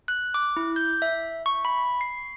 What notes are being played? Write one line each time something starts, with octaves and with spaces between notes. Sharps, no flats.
F#6
D6
E4
G6
E5
C#6
B5
C7